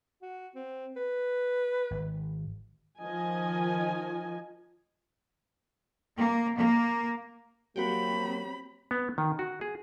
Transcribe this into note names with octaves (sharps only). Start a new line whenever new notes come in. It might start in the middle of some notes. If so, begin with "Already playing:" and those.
F#4
C4
B4
G#1
D#3 F3 D#5 G#5
A#3
A#3
F#3 A#3 C4 F#4 G4 B5
B3
D#3
F#4
G#4